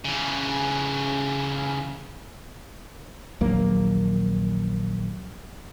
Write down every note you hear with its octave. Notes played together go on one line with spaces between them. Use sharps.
C#3 E3
A#1 D#2 F#3 A#3